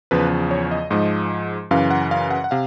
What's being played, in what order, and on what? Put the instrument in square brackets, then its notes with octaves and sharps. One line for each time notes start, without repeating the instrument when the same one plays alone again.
[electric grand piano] E2 C#3 F3 B4
C#5
D#5
G#2 F3 G#3 D#5
F#2 C#3 E3 F5
F#5
F5
F#5
F#5
C3 F5